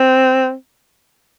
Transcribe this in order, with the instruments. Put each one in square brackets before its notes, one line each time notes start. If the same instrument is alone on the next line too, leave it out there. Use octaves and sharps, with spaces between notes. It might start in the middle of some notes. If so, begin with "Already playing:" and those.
Already playing: [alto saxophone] C4